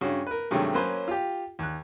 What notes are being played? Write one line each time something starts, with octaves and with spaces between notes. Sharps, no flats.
G2 C#3 C#4 F#4
A#4 B4
G2 C3 D#3 F#3 G#3 A3
F#3 A#3 C#4 B4 C5
F4 G4
D#2 F#6